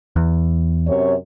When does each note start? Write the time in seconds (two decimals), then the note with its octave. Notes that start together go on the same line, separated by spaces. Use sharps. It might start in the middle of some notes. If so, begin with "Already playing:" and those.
0.16 E2
0.88 F#2 C3 C#5